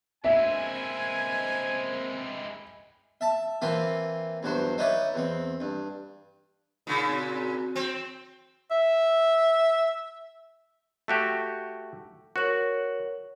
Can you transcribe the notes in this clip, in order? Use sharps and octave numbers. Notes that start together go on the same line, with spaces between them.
G#3 A#3 C4 E4 E5 G#5
E5 A5
E3 A#3 C4 F4 B5
E2 G2 F#3 C5
D#4 B4 C#5 D5 E5
E2 C4
G2
A#2 C#3 D#4
C4 F#4
C4
E5
A3 F#4 G4
F#4 A#4 C#5 F#7